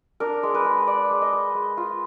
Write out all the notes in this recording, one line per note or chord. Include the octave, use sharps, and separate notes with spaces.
D4 A#4
G#3
B4
G#3
D4 D5
G#3
D#5
G#3
G#3
F4